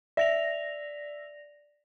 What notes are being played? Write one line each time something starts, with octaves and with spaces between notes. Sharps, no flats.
D5 E5 A#6 F7